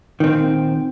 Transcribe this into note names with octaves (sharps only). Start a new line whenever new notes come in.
A#2 D#3 C4